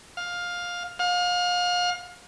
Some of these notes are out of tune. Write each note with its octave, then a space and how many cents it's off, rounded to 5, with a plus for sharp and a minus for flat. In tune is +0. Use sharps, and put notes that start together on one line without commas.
F5 +15
F5 +35